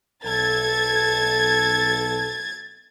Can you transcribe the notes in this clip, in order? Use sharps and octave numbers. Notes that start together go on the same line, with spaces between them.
B1 A4 G#6 A6